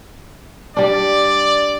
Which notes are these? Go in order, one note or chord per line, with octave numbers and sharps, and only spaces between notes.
G3 D4 D5